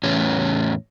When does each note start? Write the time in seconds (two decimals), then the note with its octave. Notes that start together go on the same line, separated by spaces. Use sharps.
0.03 E2 A2 C#4